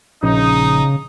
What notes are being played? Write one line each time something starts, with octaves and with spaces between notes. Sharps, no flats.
A#1 C#3 D#4 D#6